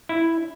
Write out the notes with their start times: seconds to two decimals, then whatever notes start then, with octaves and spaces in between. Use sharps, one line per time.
0.09 E4